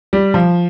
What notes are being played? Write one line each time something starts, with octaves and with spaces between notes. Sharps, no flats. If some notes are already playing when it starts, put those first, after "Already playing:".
G3
F3